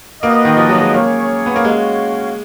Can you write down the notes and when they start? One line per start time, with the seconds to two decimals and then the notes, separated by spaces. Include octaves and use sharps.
0.23 A#3 B3 F#4 B4 D#5
0.45 D#3
0.57 F3
0.69 F#3
0.82 G#3
0.94 A#3 C#4 G#4 C#5
1.46 B3
1.56 A#3
1.65 G#3 C#4 F#4 C#5 F5